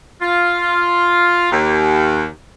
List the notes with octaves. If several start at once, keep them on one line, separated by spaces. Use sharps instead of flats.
F4
D#2